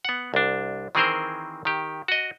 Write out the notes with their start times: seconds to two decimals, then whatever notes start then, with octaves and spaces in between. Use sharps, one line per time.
0.05 B3 F#5
0.34 C2 D4
0.95 D#3 E3 C4 G#4 A#4 C5
1.65 D#3 G4
2.08 F#4 D#5